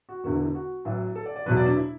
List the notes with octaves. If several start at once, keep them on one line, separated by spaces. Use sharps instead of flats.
F#4
E1 E2 D3 F#4
E4
E4
F#4
A1 A2 F#3
A4
D5
D5
E2 B2 F#3 B4
D5
D4
E4